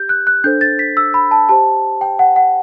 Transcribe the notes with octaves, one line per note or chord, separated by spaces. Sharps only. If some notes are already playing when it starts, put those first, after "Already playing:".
Already playing: G4 G6
F#6
F#6
D4 A4 C5 G6
A6
B6
E6
B5
A5
G4 C5 A5
G5
F#5
F#5